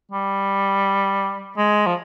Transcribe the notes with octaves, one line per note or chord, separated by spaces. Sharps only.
G3
G#3
F3